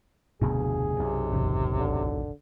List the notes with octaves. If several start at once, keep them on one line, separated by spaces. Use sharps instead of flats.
F1 D2 G2 B2 G#4
B1 F#2 C3
E1 A1 C#3
D3